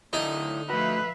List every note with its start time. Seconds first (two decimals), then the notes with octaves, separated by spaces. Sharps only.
0.13 D3 D#4 E4 A4 D5
0.69 F3 A3 F#4 B4 E5 F5